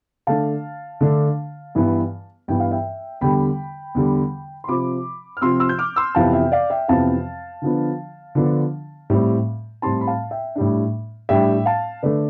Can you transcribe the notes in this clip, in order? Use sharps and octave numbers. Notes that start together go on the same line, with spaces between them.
D3 A3 D4 F5 A5
D3 A3 D4
G2 E3 B3
G2 E3 B3 G5
F5
E5 G5
E2 D3 G3 G5 B5
E2 D3 G3
C6
C3 F3 C4 B5 D6
F6
C3 F3 C4 C6 E6
C6 E6
G6
D6 F6
C6 E6
F2 C3 E3 B3 F5 A5
E5 G5
D5 F5
E5 G5
F2 C3 E3 B3 F5 A5
D3 F3 B3 D4
D3 F3 B3 D4
A2 G3 C4
A2 G3 C4 A5 C6
B5
F5 A5
E5 G5
A2 G3 D4
A2 G3 D4 E5 G5
F5 A5
D3 A3 D4 B4 D5